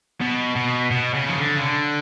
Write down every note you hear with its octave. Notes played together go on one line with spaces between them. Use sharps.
B2
B2
B2
C#3
F3
D3
C#3
D3